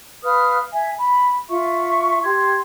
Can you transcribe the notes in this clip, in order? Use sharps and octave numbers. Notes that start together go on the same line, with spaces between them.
B4 F5 D#6 F6
E5 G#5
B5
F4 E5 C#6
G4 C6 G#6